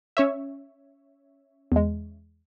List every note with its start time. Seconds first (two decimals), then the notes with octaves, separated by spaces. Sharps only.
0.17 C#4 C#5 E5
1.72 E2 G#3